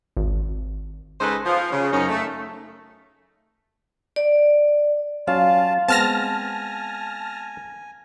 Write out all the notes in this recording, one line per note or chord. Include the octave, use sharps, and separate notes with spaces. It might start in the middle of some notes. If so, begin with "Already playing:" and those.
G#1
C#3 G#3 D#4 A4 B4 C5
F3
C#3
F#2 C#4 D#4
A3
D5
F#3 C#4 F4 F5 A5
G#3 B3 C4 G#5 A5 F6 A#6